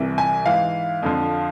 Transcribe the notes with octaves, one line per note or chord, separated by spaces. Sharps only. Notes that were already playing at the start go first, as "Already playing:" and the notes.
Already playing: C2 C3 E3
G#5
G#2 E3 F5
F2 D3 F3